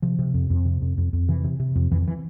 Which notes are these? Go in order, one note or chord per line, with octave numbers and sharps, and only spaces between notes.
C3 F3
C3
F2
F2
C3
F2
F2
F2
C3 E3
C3
C3
F2
F2 E3
E3